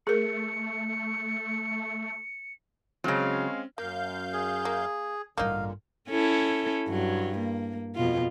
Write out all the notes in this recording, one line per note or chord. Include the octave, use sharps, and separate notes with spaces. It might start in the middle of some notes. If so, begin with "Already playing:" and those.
A3 G#4 A#4 C#7
C#3 F#3 G#3 C4 C#4 F5 A#6
F#2 A#3 F5 G6
G#4
A#3
A1 G2 A#2 D3 A#3 D#4 F5
C#4 E4 A4
G2 F#3
A#3
F2 B2 F4